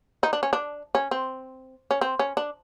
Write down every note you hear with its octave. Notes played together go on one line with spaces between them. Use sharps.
D#4
D4
C#4
D4
C#4
C4
C#4
C4
C#4
D4